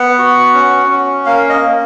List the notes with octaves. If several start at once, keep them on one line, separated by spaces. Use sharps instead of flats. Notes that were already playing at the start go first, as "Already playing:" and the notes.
Already playing: B3 F#5
F#4
C#4
C#4
A#3 F5
D#5
A#3